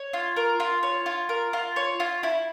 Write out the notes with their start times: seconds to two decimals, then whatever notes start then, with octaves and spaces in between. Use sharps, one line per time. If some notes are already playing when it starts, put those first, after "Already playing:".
Already playing: C#5
0.13 F4
0.36 A#4
0.60 F4
0.83 C#5
1.06 F4
1.29 A#4
1.53 F4
1.76 C#5
2.00 F4
2.23 E4